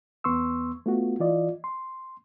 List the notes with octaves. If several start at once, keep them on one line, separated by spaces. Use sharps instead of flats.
E2 B3 C6 C#6 E6
A3 B3 F4 F#4
E3 F4 D5 D#5
C6